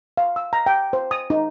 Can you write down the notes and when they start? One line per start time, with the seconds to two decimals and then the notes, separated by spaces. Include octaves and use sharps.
0.17 F5
0.36 E6
0.53 A#5
0.66 G5
0.93 C5
1.11 D#6
1.30 D#4